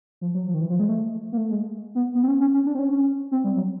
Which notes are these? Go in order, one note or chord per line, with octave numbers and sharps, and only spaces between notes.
F3
F#3
F3
D#3
E3
F3
G#3
A3
A#3
A3
G#3
B3
B3
C4
C#4
C#4
C#4
D4
C4
C#4
C#4
C4
G3
F#3